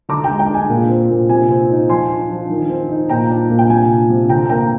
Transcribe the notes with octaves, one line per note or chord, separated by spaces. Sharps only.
D3 A#5 D6
G5 A#5
G#3
G5
D4 G#5
A#2
C4
A#2
C3 G#5
C4
D#4
F3 G#5 C6
D4
F3
D#3
C4
D#4
A#2 G5 A#5
D4
A#2
G5
C3 G#5
D4
C3
D3 G5 A#5
A#3 G5 A#5